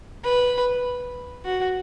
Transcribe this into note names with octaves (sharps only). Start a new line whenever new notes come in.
B4
F#4